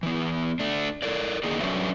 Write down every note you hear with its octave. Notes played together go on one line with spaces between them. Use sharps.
E3 B3
A3 D4
A4 A#4 D5
D3 D#3 A#3 D#4 G#4 D5
F#3 C#4 D4 A4 B4 E5